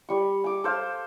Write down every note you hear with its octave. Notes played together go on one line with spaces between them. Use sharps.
G3 C#6
G#5 D6
A4 C5 F5